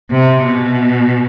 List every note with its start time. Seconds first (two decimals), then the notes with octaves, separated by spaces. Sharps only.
0.10 C3
0.43 B2